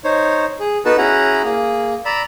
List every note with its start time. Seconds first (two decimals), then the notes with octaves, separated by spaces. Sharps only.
0.04 D#4 C5 C#5
0.60 G#4
0.85 B3 D#4 F#4 A4 B4 A5
0.98 C#4 E4 F#4 G#4 F#5 A#5
1.44 A#3 G#4
2.05 D5 A#5 B5 E6